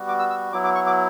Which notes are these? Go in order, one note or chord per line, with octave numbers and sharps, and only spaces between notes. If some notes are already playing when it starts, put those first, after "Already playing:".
Already playing: G3 B3 F#4
D6
E6
E6
F#3 B3 E4 D6
D6
C#6
D6